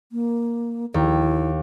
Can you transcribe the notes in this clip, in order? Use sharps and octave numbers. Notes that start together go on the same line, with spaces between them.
A#3
D#2 E4